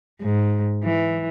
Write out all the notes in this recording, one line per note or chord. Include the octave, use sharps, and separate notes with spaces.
G#2
E3